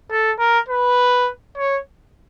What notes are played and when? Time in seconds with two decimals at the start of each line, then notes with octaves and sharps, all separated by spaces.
0.11 A4
0.39 A#4
0.69 B4
1.58 C#5